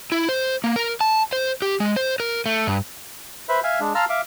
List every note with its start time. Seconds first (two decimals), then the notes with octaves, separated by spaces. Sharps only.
0.12 E4
0.29 C5
0.64 A#3
0.76 A#4
1.01 A5
1.33 C5
1.62 G4
1.80 G#3
1.96 C5
2.20 A#4
2.46 A3
2.67 G2
3.49 B4 C5 E5 B5
3.64 E5 F5 G#5
3.80 G#3 D4
3.95 F5 A5 A#5 C6 E6 F6
4.09 E5 F5 D6